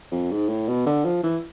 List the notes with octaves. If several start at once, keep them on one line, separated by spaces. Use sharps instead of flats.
F2
G#2
A2
B2
D3
F3
E3